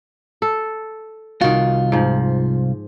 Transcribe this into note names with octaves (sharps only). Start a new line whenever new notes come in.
A4
C2 D#3 F4 F#4
G#2 F3